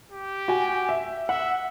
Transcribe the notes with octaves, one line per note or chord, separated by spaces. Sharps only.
G4
F#4 G#5
E5
E5 F#5